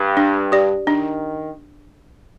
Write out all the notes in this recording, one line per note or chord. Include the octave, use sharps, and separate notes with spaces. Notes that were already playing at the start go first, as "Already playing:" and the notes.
Already playing: G2
D4
G4 D5
D#3 D4